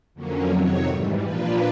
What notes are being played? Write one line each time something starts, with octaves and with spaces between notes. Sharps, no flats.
F2 D3 F#3 A#3 C#4
F2 C3 D#3 F#3 C#5
G#2 E3 G3
A#2 F3 A#3 D4 F4 B4